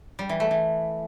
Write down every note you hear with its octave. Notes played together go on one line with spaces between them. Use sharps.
G3
E3
A3
E3